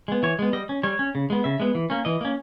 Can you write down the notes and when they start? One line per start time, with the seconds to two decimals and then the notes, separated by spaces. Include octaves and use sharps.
0.08 G#3 B3
0.23 E3 C#5
0.39 G#3 B3
0.53 G3 D#5
0.69 C#4
0.83 G3 C#5
0.99 C#4
1.15 C#3
1.30 G#3 B3
1.44 C#3 E5
1.60 G#3 B3
1.75 E3
1.90 A#3 C#4
2.05 E3 D#5
2.21 A#3 C#4